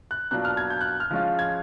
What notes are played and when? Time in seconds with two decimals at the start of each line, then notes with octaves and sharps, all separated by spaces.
0.11 F#6
0.31 B2 F#3 A#3 D4 F4 F#6
0.45 F6
0.57 G#6
0.70 G6
0.81 F#6
1.00 F6
1.11 F3 G#3 C#4 F4
1.39 G#6